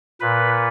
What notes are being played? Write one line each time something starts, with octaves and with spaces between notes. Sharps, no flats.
A#2 B4